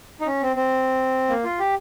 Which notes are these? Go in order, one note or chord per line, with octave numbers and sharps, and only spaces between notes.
D#4
C#4
C4
C4
A#3
F4
G4